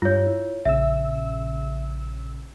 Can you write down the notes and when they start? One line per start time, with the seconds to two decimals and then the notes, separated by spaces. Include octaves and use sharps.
0.02 G2 F4 C#5
0.27 E4
0.65 A#1 C#3 E5 E6